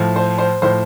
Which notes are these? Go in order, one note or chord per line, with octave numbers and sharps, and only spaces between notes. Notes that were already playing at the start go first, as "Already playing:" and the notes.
Already playing: A2 F3
C5
C5
A2 F3 C5